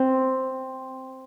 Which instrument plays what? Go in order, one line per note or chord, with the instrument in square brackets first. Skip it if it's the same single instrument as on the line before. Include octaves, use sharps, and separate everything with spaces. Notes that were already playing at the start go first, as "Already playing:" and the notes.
Already playing: [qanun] C4